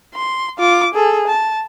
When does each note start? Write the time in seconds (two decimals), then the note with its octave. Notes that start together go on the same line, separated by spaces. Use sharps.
0.14 C6
0.59 F4 D6
0.94 G#4 A4
1.28 A5